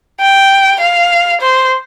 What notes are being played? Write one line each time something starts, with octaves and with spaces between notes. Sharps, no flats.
G5
F5
C5